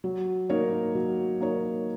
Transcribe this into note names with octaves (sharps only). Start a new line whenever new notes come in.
F#3
A#3 D#4 A#4 C#5
F#3
A#3 D#4 A#4 C#5